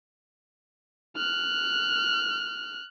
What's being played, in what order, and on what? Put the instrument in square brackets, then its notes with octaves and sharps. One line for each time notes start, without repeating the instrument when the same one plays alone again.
[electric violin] F6 F#6